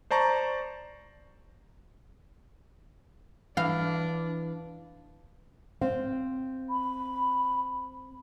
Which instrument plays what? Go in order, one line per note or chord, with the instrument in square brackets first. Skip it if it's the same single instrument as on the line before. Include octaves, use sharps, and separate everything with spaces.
[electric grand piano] C5 D5 A5 A#5 C#6
[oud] E3 F5 [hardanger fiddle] D4
[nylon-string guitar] C4 F5
[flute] B5